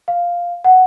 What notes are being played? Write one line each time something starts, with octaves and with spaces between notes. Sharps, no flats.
F5
F#5